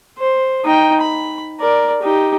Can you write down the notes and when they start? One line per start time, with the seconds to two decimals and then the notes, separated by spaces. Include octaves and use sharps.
0.18 C5
0.65 D#4 G5
1.01 B5
1.60 A#4 D5
2.03 D#4 G4